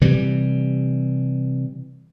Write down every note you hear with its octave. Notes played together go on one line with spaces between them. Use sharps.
C3 E3 G3